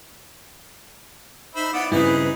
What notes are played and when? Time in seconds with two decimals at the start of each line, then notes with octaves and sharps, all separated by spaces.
1.55 D#4 C5 E5 B5
1.73 B3 E4 D5 F#5
1.92 G2 C#3 C4 D#4 E4 G#4 B4